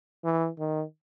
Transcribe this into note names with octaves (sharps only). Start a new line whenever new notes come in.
E3
D#3